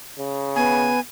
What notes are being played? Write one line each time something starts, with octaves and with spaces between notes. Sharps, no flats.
C#3
B3 G#5